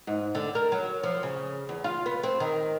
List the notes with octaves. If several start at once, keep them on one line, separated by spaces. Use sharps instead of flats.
G#2
D3
A#4
F#3
F3
C#3
E2
F4
B3
C4
D#3